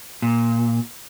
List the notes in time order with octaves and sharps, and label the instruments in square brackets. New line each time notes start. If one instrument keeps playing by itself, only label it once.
[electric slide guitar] A#2